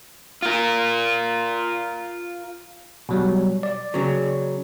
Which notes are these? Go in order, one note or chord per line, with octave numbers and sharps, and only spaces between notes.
F4 A#4
B2 F#3 G3
D5
C#3 F#3